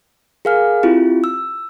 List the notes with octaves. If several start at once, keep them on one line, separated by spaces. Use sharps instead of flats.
G#4 A#4 F5 G#5 F6
C4 E4 F4 G4
E6